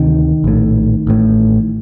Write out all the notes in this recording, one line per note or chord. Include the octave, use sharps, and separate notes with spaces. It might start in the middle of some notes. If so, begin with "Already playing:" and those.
Already playing: D2 C3 D#3
A#1 A2
A1 A2